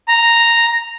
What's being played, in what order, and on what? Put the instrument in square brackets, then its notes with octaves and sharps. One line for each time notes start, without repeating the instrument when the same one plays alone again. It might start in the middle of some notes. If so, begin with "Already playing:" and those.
[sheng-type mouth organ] A#5